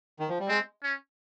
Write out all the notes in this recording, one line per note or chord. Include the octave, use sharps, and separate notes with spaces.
D#3
F3
G3
G#3 C4
C#4